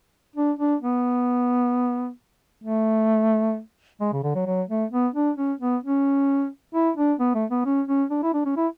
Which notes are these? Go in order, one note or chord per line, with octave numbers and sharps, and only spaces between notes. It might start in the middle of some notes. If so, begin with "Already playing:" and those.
D4
D4
B3
A3
G#3
C#3
D3
F#3
F#3
A3
B3
D4
C#4
B3
C#4
E4
D4
B3
A3
B3
C#4
C#4
D4
E4
D4
C#4
E4